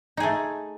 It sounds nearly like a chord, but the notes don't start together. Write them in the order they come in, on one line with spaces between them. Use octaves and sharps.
D#4 G#4 A3